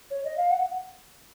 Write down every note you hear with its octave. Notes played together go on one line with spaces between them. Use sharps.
C#5
D#5
F5
F#5